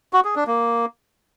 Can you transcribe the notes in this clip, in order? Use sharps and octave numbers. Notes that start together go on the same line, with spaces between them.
F#4
G#4
D4
A#3